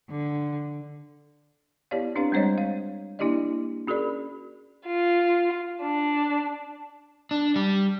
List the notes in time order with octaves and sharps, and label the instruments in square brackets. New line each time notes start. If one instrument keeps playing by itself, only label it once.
[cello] D3
[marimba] B3 E4 G4 C#5 D5 F5
C4 D4 G4 B4 F5
G3 G#3 C4 C5 C#5 D#5
F5
A#3 D4 E4 G4 D5 D#5
C#4 F#4 G#4 A#4 D5 B5
[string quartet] F4
D4
[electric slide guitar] D4
G3